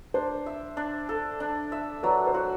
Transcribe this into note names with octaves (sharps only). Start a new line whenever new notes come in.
D4 C5
E5
D4
A4
D4
E5
F#3 B4 D5
C5
F#4